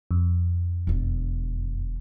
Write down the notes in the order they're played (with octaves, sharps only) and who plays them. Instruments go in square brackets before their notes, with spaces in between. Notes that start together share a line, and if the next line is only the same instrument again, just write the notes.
[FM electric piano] F2
[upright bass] E1 D3